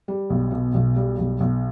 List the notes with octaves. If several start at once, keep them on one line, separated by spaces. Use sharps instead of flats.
G3
B1
B2
B1
G3
B1
B1